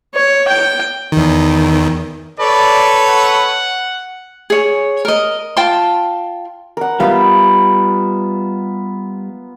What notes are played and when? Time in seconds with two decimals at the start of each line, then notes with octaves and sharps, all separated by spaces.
0.15 C#5
0.48 G5
1.12 E2 D#3
2.40 A4 B4 C#5 D5
3.09 F#5
4.50 G#4 C#5
5.05 A#4 D#5
5.57 F4 G5 A5 C6
6.77 A#4 F#5
7.00 G3 B3 F4 E5 F5